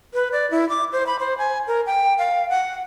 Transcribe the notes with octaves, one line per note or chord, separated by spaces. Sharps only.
B4
D5
E4
D6
C5
B5
C5
G#5
A#4
G5
F5
F#5